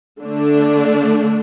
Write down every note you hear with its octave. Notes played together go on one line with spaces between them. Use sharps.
D3 A3 D4